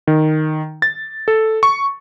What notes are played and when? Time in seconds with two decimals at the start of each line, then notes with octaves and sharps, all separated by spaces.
0.07 D#3
0.82 A6
1.28 A4
1.63 C#6